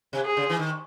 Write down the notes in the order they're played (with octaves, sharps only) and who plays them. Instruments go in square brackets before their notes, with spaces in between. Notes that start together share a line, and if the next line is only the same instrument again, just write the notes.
[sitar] C3
[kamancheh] G#4
[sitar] C#3
E3
D#3